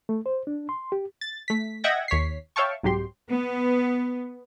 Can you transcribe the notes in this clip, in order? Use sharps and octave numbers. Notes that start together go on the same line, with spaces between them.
A3
C5
D4
C6
G4
A6
A3 B6
D#5 E5 F#5 G5 G#6 A#6
D#2 C#5 B6 C7
C#5 E5 F5 G5 A5 C#6
C2 G#2 F#3 G4 C6
B3